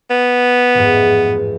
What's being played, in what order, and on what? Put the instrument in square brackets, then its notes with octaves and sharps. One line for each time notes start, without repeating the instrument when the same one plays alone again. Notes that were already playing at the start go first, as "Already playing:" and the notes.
[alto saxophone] B3
[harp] A1 F2 G#2